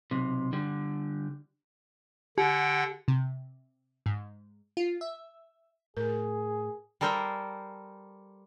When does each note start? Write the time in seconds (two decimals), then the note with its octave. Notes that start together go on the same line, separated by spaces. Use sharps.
0.11 B1 C3
0.53 D3 G3
2.38 D3 G4 F#5 G5
3.08 C3
4.06 G#2
4.77 F4
5.01 E5
5.97 A2 G#4 A#4
7.01 G3 A4 A#4 C5 G5